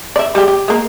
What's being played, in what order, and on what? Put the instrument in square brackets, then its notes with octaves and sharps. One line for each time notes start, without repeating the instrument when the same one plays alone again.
[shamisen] D5 E5
G3 G#3 G4
G4
G#3 A#3